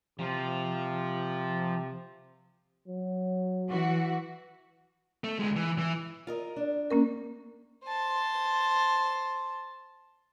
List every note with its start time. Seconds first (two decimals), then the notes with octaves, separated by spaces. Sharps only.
0.19 C3 F3 F4
2.88 F#3
3.69 E3 F#4
5.24 A3
5.39 D2 G#3
5.56 E3
5.78 E3
6.27 F4 A#4 D#5
6.56 D4
6.91 A#3 C#4 A#4
7.84 C5 A5